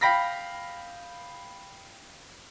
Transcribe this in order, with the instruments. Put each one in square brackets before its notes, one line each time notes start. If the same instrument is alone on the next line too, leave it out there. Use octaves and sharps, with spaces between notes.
[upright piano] F5 G5 B5 A#6 B6